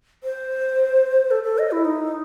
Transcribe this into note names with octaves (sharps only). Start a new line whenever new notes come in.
C5
A4
A4
D#5
E4
D#4